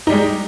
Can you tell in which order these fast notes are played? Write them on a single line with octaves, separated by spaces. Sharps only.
D#4 G3 G#3